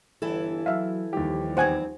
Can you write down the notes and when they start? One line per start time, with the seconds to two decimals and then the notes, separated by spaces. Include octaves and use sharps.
0.22 G1 E3 E4 A4
0.66 F#3 E5 F5
1.13 D#2 F3 G3 D#4 G4
1.57 E2 C4 C5 F#5 G#5